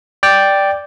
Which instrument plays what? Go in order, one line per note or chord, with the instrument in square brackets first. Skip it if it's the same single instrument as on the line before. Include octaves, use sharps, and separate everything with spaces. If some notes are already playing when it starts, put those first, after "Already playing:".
[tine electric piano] D5 G5